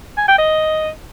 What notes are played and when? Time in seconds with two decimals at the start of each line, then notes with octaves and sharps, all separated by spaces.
0.17 G#5
0.28 G5
0.39 D#5